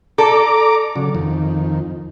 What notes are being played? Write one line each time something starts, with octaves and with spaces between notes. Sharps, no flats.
A4 D5 A#5 D6
C#3 F#3
F2 D#3